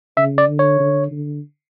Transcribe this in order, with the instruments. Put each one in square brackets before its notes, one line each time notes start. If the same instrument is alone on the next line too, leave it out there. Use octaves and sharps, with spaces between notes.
[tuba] C#3 [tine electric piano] E5
[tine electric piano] D5
[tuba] D3
[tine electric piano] C#5
[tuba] D3
D3